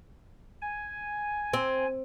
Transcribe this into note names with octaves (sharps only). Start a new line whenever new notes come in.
G#5
C4